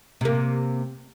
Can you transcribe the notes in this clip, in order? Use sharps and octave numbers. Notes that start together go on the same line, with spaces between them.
C3 A#3